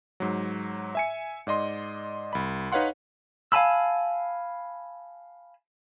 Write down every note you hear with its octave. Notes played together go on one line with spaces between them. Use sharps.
G#2 F#3
E5 G#5 C#7
G#2 D5 D#5 C6
C2 B5
D#4 B4 C#5 F5 F#5 C6
F5 G#5 A5 B5 E6